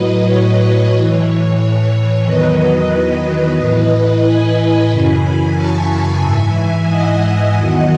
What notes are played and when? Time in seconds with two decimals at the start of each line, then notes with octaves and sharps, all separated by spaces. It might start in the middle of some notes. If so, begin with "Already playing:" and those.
Already playing: A2 F#3 B4 D#5
0.25 C#5
0.92 A2 E3
1.58 C#5
2.24 E2 D#3 F#3 B4 D#5
3.57 A2 E3
4.23 G#5 B5
4.90 F#2 C#3 E3
5.55 A5 C#6
5.89 G#5 B5
6.22 G#2 E3 E5 G#5
6.89 D#5 F#5
7.55 E2 D#3 F#3